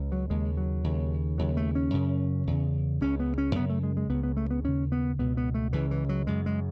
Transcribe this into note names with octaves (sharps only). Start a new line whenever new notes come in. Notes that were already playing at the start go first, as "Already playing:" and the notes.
Already playing: C#2 C#3
F#3
D#2 C#3 G#3
F#3
D#2 C#3
D#2 C#3 F#3
A3
C#4
F#2 C#3
E2 C#3
C#2 C#3 C#4
B3
C#4
F#2 C#3 B3
A3
G#3
G#3
C#2 C#3 B3
B3
A3
B3
D#2 C#3 C#4
B3
C#2 B2 B3
B3
A3
C#2 C#3 E3
E3
F#3
F#2 C#3 G#3
G#3